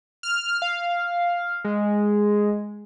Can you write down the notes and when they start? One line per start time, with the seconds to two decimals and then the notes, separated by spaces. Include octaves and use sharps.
0.23 F6
0.62 F5
1.65 G#3